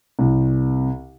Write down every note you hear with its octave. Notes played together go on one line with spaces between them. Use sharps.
C2